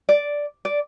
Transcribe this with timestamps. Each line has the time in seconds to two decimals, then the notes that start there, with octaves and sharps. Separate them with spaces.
0.09 D5
0.65 D5